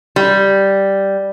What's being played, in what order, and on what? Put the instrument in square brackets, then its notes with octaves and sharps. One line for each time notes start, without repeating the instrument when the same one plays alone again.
[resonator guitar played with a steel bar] G3